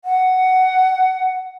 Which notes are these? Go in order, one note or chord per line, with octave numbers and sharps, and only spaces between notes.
F#5